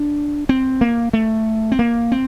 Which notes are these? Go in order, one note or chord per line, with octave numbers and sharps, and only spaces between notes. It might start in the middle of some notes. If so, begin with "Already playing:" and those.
Already playing: D4
C4
A#3
A3
C4
A#3
C4